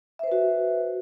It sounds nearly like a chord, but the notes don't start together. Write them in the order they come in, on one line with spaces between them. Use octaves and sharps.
E5 C5 B4 F#4